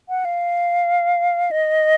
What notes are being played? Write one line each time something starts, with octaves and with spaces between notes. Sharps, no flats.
F#5
F5
D#5